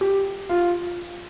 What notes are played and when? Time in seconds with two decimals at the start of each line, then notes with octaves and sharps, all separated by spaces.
0.01 G4
0.49 F4